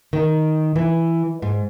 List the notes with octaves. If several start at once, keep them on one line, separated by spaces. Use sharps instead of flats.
D#3
E3
G#2